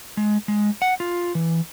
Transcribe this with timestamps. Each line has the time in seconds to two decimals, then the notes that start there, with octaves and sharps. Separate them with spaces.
0.17 G#3
0.48 G#3
0.82 F#5
1.00 F4
1.35 E3